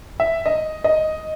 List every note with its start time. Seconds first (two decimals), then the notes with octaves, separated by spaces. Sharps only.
0.20 E5
0.46 D#5
0.84 D#5